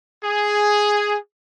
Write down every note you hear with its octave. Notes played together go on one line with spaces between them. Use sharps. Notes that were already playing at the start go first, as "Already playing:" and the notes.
G#4